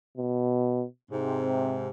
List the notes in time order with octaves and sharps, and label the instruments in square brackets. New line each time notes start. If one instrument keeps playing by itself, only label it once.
[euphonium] B2
[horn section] G#2 C3 [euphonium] C4